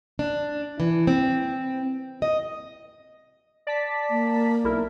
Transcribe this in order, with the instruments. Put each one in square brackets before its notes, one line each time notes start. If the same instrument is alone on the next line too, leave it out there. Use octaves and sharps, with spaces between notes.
[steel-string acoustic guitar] D4
E3
C4
D#5
[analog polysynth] D5 A5 B6
[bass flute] A#3
[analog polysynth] B1 E4 A#4